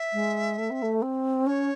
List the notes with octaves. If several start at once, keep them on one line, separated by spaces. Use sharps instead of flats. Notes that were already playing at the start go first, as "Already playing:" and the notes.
Already playing: E5
G#3
A3
C4
A3
C4
C#4 C#5